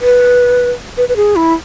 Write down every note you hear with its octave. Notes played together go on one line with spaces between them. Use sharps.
B4
B4
B4
G#4
E4